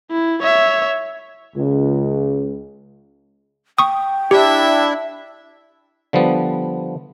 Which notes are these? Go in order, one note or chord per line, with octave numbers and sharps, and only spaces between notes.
E4
C#5 E5
C#2
G5 C#6 D#6
D4 E4 G4 E5
D3 F3 G3 B3